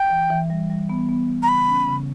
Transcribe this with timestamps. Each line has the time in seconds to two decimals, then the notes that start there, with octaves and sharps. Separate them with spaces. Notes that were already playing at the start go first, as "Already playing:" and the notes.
Already playing: G5
0.10 E3
0.30 E3
0.50 G3
0.70 G3
0.89 B3
1.09 B3
1.28 B3
1.43 A#5
1.48 C#3 B5
1.68 C#4
1.88 C#3